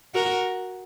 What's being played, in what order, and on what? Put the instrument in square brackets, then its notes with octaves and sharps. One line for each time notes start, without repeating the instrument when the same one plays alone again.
[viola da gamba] F#4 A#4